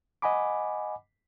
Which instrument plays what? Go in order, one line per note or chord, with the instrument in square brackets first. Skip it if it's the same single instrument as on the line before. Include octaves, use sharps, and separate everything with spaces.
[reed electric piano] D#5 F#5 G#5 B5 D6